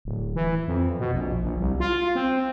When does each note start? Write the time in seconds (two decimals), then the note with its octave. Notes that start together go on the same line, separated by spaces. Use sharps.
0.05 D1
0.36 E3
0.67 F2
1.00 B2
1.13 A#1
1.44 A#1
1.59 C2
1.80 F4
2.15 C4